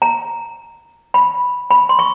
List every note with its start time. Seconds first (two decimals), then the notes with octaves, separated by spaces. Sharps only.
0.02 A#5
1.14 B5
1.71 B5
1.89 C6
1.99 C#6